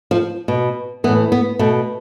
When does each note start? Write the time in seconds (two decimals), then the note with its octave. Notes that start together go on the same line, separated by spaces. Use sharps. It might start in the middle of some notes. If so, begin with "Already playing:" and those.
0.11 F3
0.48 B2
1.04 E3 B3
1.08 A2
1.32 B3
1.59 B2 A3